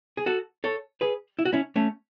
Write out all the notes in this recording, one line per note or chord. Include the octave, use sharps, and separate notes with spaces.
G#4
F#4 A4
A4 C#5
G#4 B4
E4
F#4
C#4 E4
A3 C#4